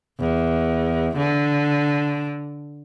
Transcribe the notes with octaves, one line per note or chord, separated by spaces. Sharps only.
E2
D3